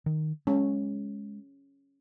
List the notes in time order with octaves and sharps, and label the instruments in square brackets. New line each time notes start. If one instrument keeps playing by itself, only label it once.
[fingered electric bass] D#3
[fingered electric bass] G#3 [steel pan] C#4